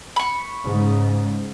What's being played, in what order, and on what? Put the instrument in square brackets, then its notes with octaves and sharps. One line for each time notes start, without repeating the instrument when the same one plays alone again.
[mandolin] B5 C#6
[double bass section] G#2 C#3